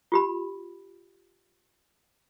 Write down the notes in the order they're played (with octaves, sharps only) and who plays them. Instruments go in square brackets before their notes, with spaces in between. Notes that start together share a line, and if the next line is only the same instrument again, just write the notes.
[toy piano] F4 G4 B5